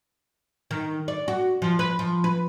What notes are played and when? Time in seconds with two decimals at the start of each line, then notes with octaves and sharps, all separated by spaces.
0.71 D#3
1.08 D5
1.28 F#4
1.62 F3
1.79 B4
1.99 F3
2.24 B4